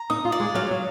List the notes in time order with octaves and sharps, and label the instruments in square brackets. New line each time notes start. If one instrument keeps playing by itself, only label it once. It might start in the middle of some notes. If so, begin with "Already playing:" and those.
Already playing: [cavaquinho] A#5
[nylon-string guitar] D#4 [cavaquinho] D#6
[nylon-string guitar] F4
[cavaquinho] D5
[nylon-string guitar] G#3
[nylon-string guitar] F#3 [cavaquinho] F5
[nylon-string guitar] F#3